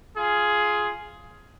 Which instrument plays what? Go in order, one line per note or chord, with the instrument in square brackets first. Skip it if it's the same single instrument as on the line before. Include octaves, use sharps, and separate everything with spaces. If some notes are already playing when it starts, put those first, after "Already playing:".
[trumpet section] F4 G#4